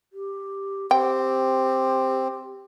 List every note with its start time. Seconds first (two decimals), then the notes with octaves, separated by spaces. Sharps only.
0.13 G4
0.91 C4 G4 G5